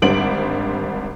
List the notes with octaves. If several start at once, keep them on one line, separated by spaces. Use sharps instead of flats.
G#1 D3 G3 C5 D7 F#7